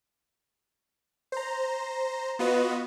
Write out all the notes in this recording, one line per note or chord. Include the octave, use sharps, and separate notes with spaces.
C5 A#5
B3 F4 F#4 B4 D#5